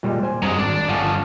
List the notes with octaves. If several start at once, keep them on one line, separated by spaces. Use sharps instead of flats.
A#2 G3 G#3
C5 G#5
G2 F#3 G#3 C4 G#5
G#1 D4 D5
G1 F3 C#4 F#5 G#5